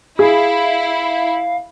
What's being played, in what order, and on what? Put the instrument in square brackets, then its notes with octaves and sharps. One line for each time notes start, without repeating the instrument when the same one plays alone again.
[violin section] E4 [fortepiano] G#4 [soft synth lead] F5